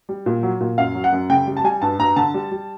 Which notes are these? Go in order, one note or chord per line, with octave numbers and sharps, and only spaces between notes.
G3
A#2
F#3
A#2
F#2 F5
F#3
F#5
F#2
C#3 G5
G3
A5
G3 G#5
G2 A5
G2 A#5
D3 A5
G3
G3